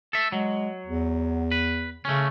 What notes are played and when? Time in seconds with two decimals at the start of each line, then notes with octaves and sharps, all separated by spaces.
0.13 A4 E5
0.32 F#3 G#3
0.86 E2
1.52 B4
2.05 C#3 A3 C#4